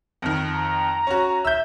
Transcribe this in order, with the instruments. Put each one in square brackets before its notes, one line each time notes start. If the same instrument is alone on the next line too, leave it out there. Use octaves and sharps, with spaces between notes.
[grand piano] F2 D#3
[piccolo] A#5
[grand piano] C#4 F#4
[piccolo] E5 [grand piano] E6 G6